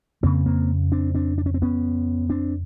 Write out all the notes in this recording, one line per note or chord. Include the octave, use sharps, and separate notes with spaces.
F2 C#3 A#3 C4
A#3 C4
C4 D4
C4 D4
D4
C#4
C4
B3 C#4
C4 D4